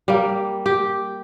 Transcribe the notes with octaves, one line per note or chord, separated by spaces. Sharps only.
G3 A#3
G4